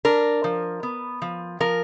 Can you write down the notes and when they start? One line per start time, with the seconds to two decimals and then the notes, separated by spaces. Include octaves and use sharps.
0.05 D4 A#4
0.44 F3
0.83 B3
1.22 F3
1.60 F3 A#4